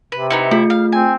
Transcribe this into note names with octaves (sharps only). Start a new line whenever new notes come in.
C3 B4
B3 D#4 E4 C#7
A3 E4 F4 G#4
F5
C4 G#5